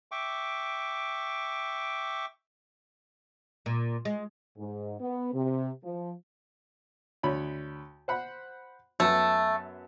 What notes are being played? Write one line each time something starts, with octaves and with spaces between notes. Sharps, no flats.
E5 G5 C#6 D6
A#2
G#3
G#2
B3
C3
F3
D2 C#5 B5
C5 F#5 B5
F#2 A3 B3 A5